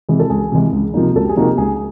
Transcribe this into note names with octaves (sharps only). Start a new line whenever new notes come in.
C3 E3 G#3
A4
C#2 G#4
C3 E3 G#3
C#2
C3 F3 A#3 D#4
C#2 A4
G4
G#4
C3 F3 A#3 D#4 F#4
G4
C#2 G#4